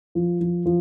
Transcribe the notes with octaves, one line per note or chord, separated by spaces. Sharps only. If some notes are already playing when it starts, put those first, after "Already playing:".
F3
F3
F3